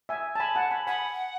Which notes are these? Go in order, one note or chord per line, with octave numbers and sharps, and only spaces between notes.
E5 G#5
A5
G#5 B5
F#5 A5
G#5 B5
F#5 G#5 B5